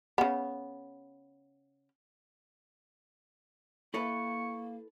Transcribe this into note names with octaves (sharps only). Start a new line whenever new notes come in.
C#3 B3
A#3 E4 A4 B4 C#6